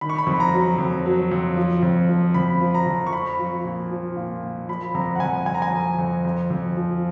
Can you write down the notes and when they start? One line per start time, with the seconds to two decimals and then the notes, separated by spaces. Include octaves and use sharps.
0.01 D#3 B5
0.09 C#6
0.18 B5
0.27 F2
0.40 A#5
0.54 F#3
0.78 F2
1.06 F#3
1.31 F2
1.57 F3
1.83 F2
2.09 F3
2.34 F2 B5
2.61 F3
2.74 A#5
2.86 F2
3.06 C#6
3.12 F3 B5
3.39 F3
3.65 A#2
3.91 F3
4.17 A#2
4.43 A#2
4.68 F3 B5
4.94 F2 A#5
5.15 F#5
5.20 F2 G#5
5.46 F2 G#5
5.54 A#5
5.62 G#5
5.73 F2
5.98 F2
6.25 F2
6.50 F2
6.77 F3